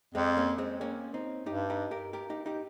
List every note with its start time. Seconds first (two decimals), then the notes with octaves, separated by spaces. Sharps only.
0.14 F2 G#3 C4
0.37 A#3 C#4
0.58 G#3 C4
0.81 A#3 C#4
1.14 C4 D#4
1.46 G2 D#4 G4
1.70 D#4 G4
1.91 G4 A#4
2.13 G4 A#4
2.30 D#4 G4
2.46 D#4 G4